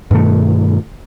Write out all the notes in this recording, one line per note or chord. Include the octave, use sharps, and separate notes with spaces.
G2 B2 D#3 A3